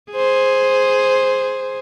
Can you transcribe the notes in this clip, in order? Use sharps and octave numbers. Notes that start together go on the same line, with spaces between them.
G#4 C5